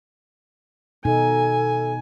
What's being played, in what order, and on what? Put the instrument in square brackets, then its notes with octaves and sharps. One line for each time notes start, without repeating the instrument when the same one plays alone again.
[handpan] B2 D#4 [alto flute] A4 [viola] G#5